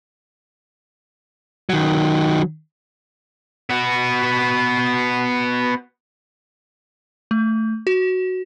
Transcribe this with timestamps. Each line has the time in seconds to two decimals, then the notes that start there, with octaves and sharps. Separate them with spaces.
1.69 D#3 F#3
3.70 B3 F#4
7.31 A3
7.87 F#4